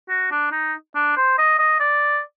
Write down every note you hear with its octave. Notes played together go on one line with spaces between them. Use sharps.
F#4
D4
D#4
D4
C5
D#5
D#5
D5